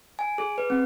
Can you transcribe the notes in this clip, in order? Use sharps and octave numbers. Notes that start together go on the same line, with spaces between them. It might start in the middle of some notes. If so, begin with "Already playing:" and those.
G#5
G#4
B4
C4